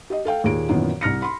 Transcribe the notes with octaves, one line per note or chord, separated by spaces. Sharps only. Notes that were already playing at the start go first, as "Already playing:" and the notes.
G4 D#5
A4 F5 G5
D#2 A#2 G#4 D7
F#2 A#2 D#3 E3 B3
C2 F6 A#6 C#7
B5 C6